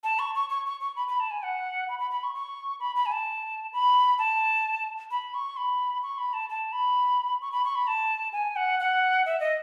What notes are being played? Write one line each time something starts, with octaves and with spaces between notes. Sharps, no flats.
A5
C#6
C#6
C#6
C#6
C#6
B5
B5
A5
G#5
F#5
B5
B5
B5
C#6
C#6
B5
B5
G#5
A5
B5
A5
B5
C#6
B5
C#6
B5
A5
A5
B5
C#6
B5
C#6
B5
A5
G#5
F#5
F#5
E5
D#5